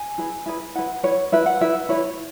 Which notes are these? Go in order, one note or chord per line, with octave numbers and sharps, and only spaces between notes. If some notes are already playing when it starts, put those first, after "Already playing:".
Already playing: G#5
E4 G#4 B4
E4 G#4 B4
E4 B4 F#5
E4 B4 C#5
E4 B4 E5
F#5
E4 B4 E5
E4 B4 C#5